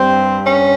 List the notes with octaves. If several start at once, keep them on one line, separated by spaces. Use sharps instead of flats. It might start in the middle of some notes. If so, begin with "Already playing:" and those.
Already playing: G2 G3 C4
C#4